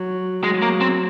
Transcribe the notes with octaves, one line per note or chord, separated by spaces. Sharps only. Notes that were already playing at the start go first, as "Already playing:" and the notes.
Already playing: F#3
F#3 G#3
A#3
C4